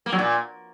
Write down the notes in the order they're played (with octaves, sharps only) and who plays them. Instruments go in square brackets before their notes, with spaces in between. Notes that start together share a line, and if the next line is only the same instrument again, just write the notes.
[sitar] A#3
F#3
A#2